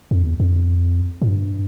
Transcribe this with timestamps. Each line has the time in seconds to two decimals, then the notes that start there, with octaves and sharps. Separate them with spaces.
0.11 F2
0.22 E2
0.40 F2
1.22 A2
1.28 G2